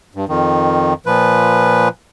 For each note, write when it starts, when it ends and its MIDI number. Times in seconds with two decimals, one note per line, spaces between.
0.15 0.25 43
0.29 0.94 41
0.29 0.94 51
1.06 1.88 46
1.06 1.88 53
1.06 1.88 71